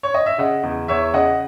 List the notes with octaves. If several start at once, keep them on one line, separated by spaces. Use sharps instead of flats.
C#5
D#5
E5
C#3 D#5 F#5
E2
E2 C#5 E5
C#3 D#5 F#5